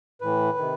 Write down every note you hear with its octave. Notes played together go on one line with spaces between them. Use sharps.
A2 E3 B4
C3 D#3